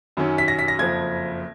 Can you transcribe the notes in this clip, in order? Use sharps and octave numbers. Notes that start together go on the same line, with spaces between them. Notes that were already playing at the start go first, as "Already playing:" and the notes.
F#2 D#3 F#3 C#4
B6
A#6
B6
A#6
F#1 F2 F3 G#6